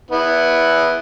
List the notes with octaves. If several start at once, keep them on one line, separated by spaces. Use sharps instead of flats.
B3 E4